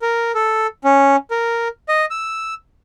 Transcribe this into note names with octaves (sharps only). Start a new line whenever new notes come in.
A#4
A4
C#4
A#4
D#5
E6